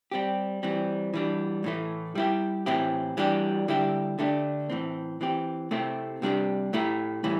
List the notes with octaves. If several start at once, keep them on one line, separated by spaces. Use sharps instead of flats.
G3 C4 G4
E3 G3 C4
E3 G3 D4
A2 E3 A3
G3 E4 G4
A2 E3 C4 E4 G4
E3 G3 D4 G4
D3 G3 E4 G4
D3 A3 D4 G4
A2 E3 C4
E3 C4 G4
C3 A3 C4 E4 G4
C3 G3 D4 G4
A2 A3 E4 G4
A2 E3 G3 E4